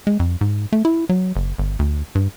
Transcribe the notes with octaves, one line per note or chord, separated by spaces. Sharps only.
G#3
F2
G#2
A3
E4
F#3
F#1
G1
D2
G2